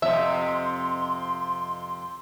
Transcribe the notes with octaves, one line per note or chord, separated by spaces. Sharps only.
F2 C3 E5 C6